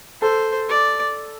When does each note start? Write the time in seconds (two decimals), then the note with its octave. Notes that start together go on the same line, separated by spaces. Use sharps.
0.21 A4 C5
0.69 D5